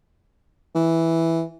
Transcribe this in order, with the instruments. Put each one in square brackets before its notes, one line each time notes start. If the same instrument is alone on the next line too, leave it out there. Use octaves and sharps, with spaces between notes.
[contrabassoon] E3